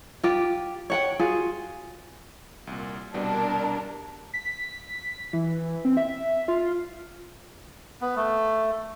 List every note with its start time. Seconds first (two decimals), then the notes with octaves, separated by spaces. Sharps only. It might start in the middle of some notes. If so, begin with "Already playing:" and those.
0.23 F4 G4
0.90 C#5 F#5 G5
1.19 F4 F#4 G#4
2.67 C2 A#2
3.14 C2 B2 G3 D4 A#4
4.33 B6
5.33 E3
5.85 C4
5.97 E5
6.48 F4
8.01 B3
8.16 A3